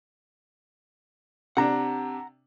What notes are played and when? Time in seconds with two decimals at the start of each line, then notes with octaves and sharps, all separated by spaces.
1.57 C3 D4 F#5 A#5